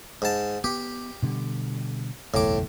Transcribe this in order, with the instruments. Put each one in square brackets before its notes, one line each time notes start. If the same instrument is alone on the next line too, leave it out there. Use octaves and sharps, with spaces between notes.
[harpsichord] G#2 A5
[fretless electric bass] B3 [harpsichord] G4
[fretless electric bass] B2 D3 G3
[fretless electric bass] F#1 B1 E2 [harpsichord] A2 D6